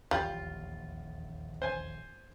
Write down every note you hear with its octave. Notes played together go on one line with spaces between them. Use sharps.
D#1 A#1 E2 G3 F4
C5 G#5